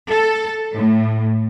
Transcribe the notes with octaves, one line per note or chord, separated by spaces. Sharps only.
A4
A2